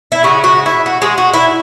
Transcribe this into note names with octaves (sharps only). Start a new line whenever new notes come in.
E4
C#3 G#3 C#4 F#4
F#4
E4
F#4
G#3 G#4
F#4
E4